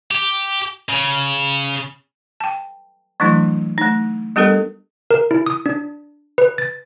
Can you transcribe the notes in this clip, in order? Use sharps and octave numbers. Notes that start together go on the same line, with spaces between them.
G4
C#3
G5 A5
E3 F#3 A3 D4 E4
A3 D#4
G3 B3 D4 G4 A4 A#4
A#4
E4
D#6
D4
B4
A6